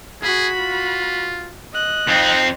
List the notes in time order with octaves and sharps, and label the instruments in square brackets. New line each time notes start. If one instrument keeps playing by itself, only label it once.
[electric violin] F#4 B5 [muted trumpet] G#4
[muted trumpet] F4
[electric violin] D#5 F#6
[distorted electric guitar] F2 C4 [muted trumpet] D#4